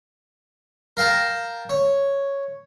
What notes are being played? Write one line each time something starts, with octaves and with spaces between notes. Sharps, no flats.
A#4 F5 G5 A5 A#5
C#5